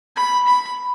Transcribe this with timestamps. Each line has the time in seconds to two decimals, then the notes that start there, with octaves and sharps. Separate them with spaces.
0.16 B5
0.47 B5